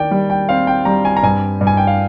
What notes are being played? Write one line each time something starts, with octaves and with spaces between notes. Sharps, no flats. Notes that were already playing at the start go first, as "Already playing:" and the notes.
Already playing: D#3 D5 G5
G3
G5
C4 F5
G5
G3 A#5
G#5
A#5
G2 G#5
G2
G#5
G5
F5